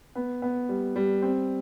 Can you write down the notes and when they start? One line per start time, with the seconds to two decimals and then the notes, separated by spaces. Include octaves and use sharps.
0.15 B3
0.42 B3
0.69 G3
0.96 G3
1.23 C4